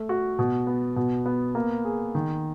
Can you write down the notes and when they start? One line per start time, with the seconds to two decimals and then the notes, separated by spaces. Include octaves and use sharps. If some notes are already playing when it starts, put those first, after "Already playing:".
Already playing: A3
0.09 F#4
0.39 B2
0.67 B3
0.96 B2
1.26 B3
1.55 A#3
1.85 G#4
2.15 D#3